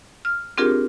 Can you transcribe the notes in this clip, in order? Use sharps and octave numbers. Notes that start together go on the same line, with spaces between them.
F6
C4 D4 F4 G4 G#4 A#4